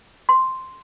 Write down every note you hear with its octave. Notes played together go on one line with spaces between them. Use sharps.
C6